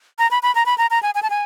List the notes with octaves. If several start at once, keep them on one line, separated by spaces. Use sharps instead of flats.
A#5
B5
B5
A#5
B5
A#5
A#5
G#5
G#5
A5
G#5